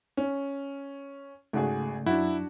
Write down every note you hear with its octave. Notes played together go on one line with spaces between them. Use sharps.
C#4
G#1 C#3 A3 F#4 G#4
F#2 F#3 D4 E4 F#4